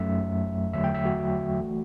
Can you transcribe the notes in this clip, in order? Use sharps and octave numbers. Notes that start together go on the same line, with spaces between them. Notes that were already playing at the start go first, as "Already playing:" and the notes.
Already playing: F#2 F#3 A3 E5
E2 D3 F#3 A3 E5
G5
E5
F#4
E3 A3